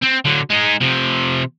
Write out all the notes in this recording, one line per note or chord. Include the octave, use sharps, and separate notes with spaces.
C4
D3 F#3
G#3 D#4
C3 F3